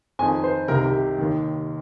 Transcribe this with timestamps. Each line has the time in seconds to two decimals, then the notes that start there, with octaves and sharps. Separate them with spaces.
0.19 F2 G#5
0.22 D#3
0.44 C5
0.68 C2 C3 D#3 A#4
0.86 G4
1.18 D#2 D#3